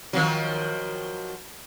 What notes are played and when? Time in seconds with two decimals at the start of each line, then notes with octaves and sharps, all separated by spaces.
0.13 D#3 F3 F#3